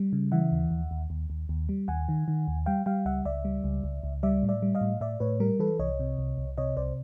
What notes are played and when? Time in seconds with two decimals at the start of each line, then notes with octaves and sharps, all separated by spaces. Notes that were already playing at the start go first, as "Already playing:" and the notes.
Already playing: G3
0.13 C#3
0.32 E3 E5 F#5
0.52 D#2
0.71 D#2
0.91 D#2
1.10 D#2
1.30 D#2
1.49 D#2
1.69 G3
1.88 D#2 F#5 G#5
2.09 D#3
2.28 D#3
2.48 D#2
2.66 G3 F5 G5
2.86 G3 F5 G5
3.05 C#2 E5 F#5
3.25 C#2 D5 E5
3.45 G3
3.64 C#2
3.84 C#2
4.03 C#2
4.23 G3 D5 E5
4.43 A2
4.49 D5 E5
4.62 G3
4.75 D#5 F5
4.81 A2
5.01 A2 D5 E5
5.20 A2 B4 C#5
5.40 G3 A#4
5.59 E3 A4 B4
5.79 C2 C#5 D#5
6.00 C3
6.19 C2
6.38 C2
6.58 C3 C#5 D#5
6.77 C2 C5 D5